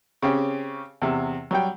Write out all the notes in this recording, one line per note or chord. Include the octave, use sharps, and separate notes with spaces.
C#3 C4 C#4 G4
E2 C3
F#3 G3 G5